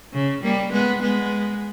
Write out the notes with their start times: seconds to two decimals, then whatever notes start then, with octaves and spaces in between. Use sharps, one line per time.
0.13 C#3
0.43 G3 A#3
0.73 G#3 B3
1.02 G#3 B3